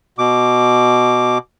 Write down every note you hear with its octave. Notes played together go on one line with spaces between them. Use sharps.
B2 D6